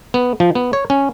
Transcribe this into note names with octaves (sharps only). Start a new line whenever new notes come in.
B3
F3
B3
C#5
C#4